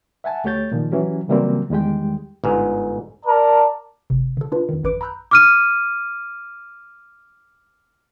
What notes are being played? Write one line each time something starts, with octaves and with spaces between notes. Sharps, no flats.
E5 F#5 G#5 A5
D2 A3 G4 C#5 G6 A6
A#2 D#3 F3
E3 F#3 C#4 G4
C#3 E3 F#3 G3 A#3 C4
E2 D#3 G3 G#3 G4 G5
G1 G#2
A#4 D5 A5
G1 C3
D3 A4
D4 F4 B4
F2 D#3
A1 F#2 B4 D6 D7
A#5 B5 E6 F#6 G6
D6 F6 D#7